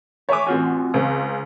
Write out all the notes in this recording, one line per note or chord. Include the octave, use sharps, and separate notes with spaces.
C#5 E5 G#5 D6
A1 C4 F4 F#4 G#5
C#2 C#3 C4